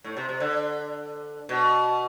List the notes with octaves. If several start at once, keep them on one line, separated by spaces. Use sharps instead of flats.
A2
C3
C3
D3
B2